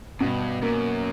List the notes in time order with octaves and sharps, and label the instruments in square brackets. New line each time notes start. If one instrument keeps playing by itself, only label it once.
[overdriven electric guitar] G2 [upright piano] B2
[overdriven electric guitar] F#2 [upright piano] A#3